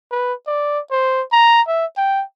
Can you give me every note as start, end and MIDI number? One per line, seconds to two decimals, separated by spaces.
0.11 0.33 71
0.47 0.79 74
0.91 1.23 72
1.32 1.61 82
1.68 1.86 76
1.97 2.23 79